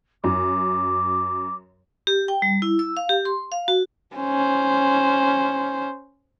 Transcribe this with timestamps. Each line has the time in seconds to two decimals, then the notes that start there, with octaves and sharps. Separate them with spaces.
0.24 F#2 D6
2.07 G4
2.28 G5
2.42 G3
2.62 E4
2.79 E6
2.97 F5
3.09 G4
3.25 C6
3.52 F5
3.68 F#4
4.15 C#4 C5